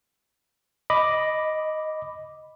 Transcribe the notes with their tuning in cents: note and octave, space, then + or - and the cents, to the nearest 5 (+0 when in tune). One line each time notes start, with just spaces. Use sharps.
D#5 +0 B5 +0 D6 +0